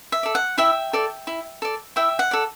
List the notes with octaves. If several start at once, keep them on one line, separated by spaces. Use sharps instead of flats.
E5
A4 D5
F#5
E4 E5 G5
A4 D5
E4
A4 D5
E4 E5 G5
F#5
A4 D5